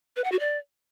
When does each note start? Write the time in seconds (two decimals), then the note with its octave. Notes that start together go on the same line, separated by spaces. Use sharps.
0.16 B4
0.24 F#5
0.32 F#4
0.39 D5